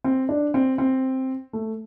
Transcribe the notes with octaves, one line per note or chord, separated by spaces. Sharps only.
C4
D4
C4
C4
A3